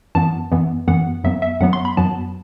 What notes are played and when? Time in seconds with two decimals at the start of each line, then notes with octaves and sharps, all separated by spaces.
0.15 F#2 E3 B3 A5
0.51 F#2 E3 B3
0.88 F#2 E3 B3 F#5
1.24 F#2 F#3 B3 E5
1.42 E5
1.60 F#2 F#3 B3 F#5
1.73 C6
1.85 B5
1.97 F#2 F#3 B3 A5